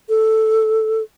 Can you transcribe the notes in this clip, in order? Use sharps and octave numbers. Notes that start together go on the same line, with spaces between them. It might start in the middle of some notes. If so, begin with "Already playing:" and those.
A4